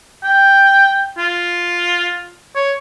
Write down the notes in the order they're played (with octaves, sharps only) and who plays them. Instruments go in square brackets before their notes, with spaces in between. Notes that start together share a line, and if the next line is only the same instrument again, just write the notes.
[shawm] G5
F4
C#5